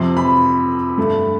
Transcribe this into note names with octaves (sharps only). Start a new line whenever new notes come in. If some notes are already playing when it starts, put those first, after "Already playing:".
Already playing: F2 C3 F3 C6
B5
G2 D3 A3